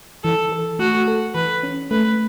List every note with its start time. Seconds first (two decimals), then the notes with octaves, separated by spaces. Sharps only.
0.24 E3 A4
0.52 A4
0.79 A3 F#4
1.08 A4
1.35 E3 B4
1.63 C#4
1.91 A3 B4